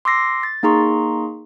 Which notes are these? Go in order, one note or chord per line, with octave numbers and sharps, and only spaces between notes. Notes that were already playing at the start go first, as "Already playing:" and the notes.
C6 D6 E6 A#6 C7
A6
A#3 D#4 G#4 A#5 C6 C#6